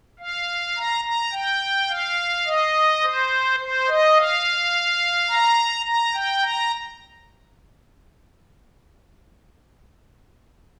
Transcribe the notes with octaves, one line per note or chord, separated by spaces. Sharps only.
F5
A#5
A#5
G5
F5
D#5
C5
C5
D#5
F5
A#5
A#5
G5
A#5